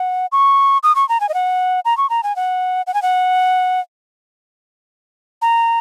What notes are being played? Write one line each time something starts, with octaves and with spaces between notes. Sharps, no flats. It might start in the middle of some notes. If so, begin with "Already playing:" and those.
Already playing: F#5
C#6
D#6
C#6
A#5
G#5
D#5
F#5
A#5
C#6
A#5
G#5
F#5
F#5
G#5
F#5
A#5